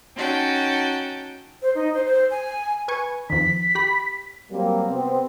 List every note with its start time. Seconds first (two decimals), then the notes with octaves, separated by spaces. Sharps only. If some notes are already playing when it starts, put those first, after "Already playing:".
0.16 C#4 D#4 F#4 G5 A5
1.62 C5
1.75 D#4
1.94 C5
2.06 C5
2.31 G#5
2.88 B4 G#5 C#6
3.30 F2 D#3 B6
3.75 G4 B5
4.52 F#3 G3 A#3 C4
4.89 C3 B3 C4